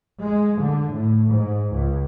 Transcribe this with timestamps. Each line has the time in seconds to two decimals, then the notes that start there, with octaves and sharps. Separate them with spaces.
0.21 G#3
0.60 D3
0.92 A2
1.29 G#2
1.73 C#2